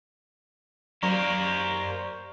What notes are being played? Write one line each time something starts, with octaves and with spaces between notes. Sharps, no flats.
F#2 A#3 G4 A#4 C5 D5 A#5 C#6